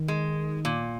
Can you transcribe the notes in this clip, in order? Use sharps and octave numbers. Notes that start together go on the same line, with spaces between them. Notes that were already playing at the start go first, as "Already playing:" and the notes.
Already playing: D#3
G#3
A#2